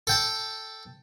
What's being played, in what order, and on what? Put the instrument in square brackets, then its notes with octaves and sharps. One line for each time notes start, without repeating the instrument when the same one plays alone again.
[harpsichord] A4 G5 A5